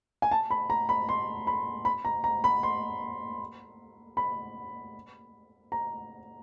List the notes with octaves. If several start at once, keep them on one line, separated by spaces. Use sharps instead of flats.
G#5
A5
B5
A#5
B5
C6
B5
B5
A#5
A#5
B5
C6
B5
A#5